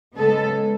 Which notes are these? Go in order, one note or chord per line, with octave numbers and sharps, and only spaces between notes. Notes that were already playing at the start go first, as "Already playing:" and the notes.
C#3 G#3 B3 A4